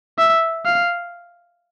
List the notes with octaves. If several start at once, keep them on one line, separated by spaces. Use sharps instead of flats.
E5
F5